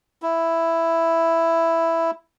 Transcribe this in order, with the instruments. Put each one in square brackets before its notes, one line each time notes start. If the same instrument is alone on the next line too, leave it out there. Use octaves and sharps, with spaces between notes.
[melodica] E4